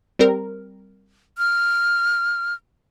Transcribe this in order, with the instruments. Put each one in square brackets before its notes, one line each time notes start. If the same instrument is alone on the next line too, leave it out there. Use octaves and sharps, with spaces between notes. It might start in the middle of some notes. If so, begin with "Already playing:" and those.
[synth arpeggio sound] G3 C4 A#4
[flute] F6